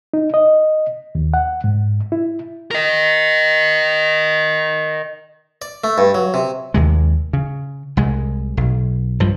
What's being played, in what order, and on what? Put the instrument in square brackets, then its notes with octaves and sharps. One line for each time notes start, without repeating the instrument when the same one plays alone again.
[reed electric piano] D#4
D#5
D#2
F#5
G#2
E4
[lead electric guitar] A#4 D#5
[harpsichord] D5
A3
G2
F#3
C3
[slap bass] D#2 C3 G#3
C#3
C2 G#3
B1
G2 F3